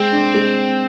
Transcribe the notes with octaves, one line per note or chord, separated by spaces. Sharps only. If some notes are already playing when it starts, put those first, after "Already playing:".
Already playing: G#3 C4
D4
G#3